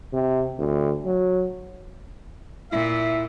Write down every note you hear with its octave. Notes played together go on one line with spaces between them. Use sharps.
C3
D2
F#3
A#2 E4 E5